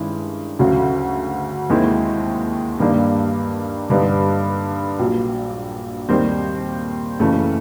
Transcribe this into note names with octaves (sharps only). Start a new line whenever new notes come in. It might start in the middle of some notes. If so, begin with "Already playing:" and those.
Already playing: G2 D#3 G#3 C#4 E4
D2 C#3 F#3
D#2 D#3 G#3 C4 E4
G2 D#3 G3 A#3 D4
G2 D3 G3 B3 D#4
A#1 A#2 F#3
D#2 D#3 G3 C4
F#1 F#2 C#3 E3 A3